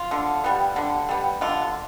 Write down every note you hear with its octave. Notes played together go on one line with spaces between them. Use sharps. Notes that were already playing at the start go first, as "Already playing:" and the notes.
Already playing: F4
D3
G3 B3
D3
G3 B3
D3 F4